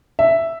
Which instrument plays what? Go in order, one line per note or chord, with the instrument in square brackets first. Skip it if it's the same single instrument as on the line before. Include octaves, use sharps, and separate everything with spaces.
[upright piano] E5